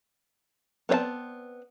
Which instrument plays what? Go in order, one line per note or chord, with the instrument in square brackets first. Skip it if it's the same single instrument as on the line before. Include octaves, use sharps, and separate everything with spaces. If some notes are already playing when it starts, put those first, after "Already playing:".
[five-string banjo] B3 C4 C#5 D5 A5